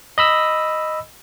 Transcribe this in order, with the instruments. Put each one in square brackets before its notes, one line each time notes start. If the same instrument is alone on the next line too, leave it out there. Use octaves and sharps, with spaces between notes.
[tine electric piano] D#5 B5 E6